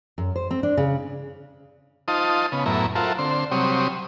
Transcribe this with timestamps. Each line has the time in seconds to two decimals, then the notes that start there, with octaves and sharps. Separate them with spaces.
0.18 F#2
0.36 C5
0.51 C4
0.63 D4
0.77 C#3
2.08 D#4 F4 C5 A5 D#6
2.52 C#3 B3
2.66 F#2 A2 B3 E4 A#5
2.95 F4 F#4 A4 A#4 C5 E5
3.19 D3 C4 C5
3.52 C3 F#3 G3 C4 C#5 D#6